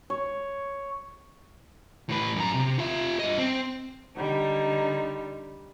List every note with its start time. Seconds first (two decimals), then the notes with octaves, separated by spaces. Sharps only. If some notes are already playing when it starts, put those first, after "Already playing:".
0.10 C#5
2.09 A2 B4
2.36 F#2 A#5
2.54 C3
2.79 F4 E5
3.19 G2 D#5
3.38 C4
4.17 D3 G3 D#4